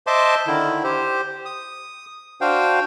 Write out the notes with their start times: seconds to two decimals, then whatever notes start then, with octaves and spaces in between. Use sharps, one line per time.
0.07 C5 D#5 E5 A5 C6 D6
0.47 D3 D#3 E4
0.84 G4 C5
1.45 D#6
2.41 D4 F#4 C5 F5 G5